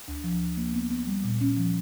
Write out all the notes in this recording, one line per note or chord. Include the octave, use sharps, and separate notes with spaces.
D2
F3
F3
A#3
B3
B3
G3
A#2
C#4
F3